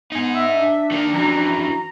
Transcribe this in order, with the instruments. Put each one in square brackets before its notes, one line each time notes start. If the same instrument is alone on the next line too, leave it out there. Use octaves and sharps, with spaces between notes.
[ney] B3 [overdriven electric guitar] D#4 G#4
[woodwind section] E5
[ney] D4
[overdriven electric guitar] D#3 A#3
[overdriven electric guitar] F2 E3 [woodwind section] C#4 F#4 A#5